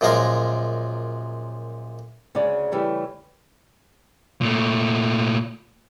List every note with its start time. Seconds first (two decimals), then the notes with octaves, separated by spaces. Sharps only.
0.01 F#2 A#2 F3 G#3 A#4 F5
2.35 D2 C#3 G#3 D5
2.72 C#3 E3 G3 A3
4.41 A#2 A3